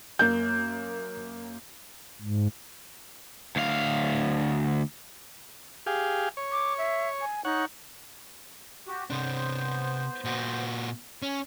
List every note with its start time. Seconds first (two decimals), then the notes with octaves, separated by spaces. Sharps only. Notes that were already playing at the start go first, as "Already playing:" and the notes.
0.19 F#2 A#3 G6
2.22 G#2
3.56 D2 F5
5.86 G4 G#4 F5
6.37 C#5
6.52 D6
6.78 E5
7.21 G#5
7.45 D#4 C#5 F#5
8.87 F#4 G4
9.10 C3 B3 D4 C5
10.24 A#2 F#4
11.22 C#4